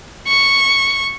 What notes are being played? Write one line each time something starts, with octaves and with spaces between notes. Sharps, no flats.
C#6